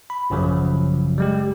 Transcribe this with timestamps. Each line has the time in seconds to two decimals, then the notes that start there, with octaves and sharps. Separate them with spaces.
0.10 B5
0.30 A1 F#2 C#3 F3 F#3
1.18 G3 G#3 G4